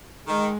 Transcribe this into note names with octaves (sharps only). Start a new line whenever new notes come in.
D#3 G#3